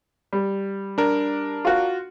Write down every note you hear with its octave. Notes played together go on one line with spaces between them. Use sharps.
G3
D4 A#4
F4 F#4